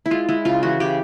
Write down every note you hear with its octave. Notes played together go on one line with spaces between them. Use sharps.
E4
G#3 F4
G#3 E4
C#3 F4
E3 F#4
C#3 G4